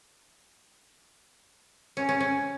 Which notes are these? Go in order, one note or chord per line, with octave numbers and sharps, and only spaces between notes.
C#4
C#4
C#4